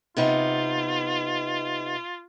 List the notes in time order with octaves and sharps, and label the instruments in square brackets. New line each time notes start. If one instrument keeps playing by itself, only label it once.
[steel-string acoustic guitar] C3 B3 D#4 [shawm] F4